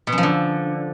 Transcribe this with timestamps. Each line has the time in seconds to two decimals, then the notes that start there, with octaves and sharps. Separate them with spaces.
0.07 B2
0.12 F#2
0.18 F3
0.23 D3